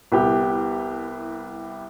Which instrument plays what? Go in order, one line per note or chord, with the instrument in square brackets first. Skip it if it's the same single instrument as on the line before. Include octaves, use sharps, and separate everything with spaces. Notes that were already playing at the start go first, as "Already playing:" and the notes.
[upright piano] C2 B3 E4 G4